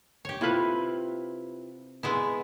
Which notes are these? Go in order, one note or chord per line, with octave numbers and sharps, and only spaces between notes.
G4 C#5
C3 E4 F4 B4
G#3 B3 E4